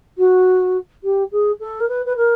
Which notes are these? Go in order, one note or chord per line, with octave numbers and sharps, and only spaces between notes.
F#4
G4
G#4
A4
A#4
B4
B4
A#4